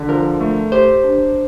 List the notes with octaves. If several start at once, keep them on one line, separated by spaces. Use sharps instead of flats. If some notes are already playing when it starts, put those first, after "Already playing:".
Already playing: D3
F3 A#4
A3
G4 C5
D4